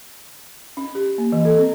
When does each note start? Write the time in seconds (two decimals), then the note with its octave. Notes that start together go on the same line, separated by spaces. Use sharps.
0.77 C#4
0.95 G4
1.18 A#3
1.32 E3
1.45 A4
1.58 C4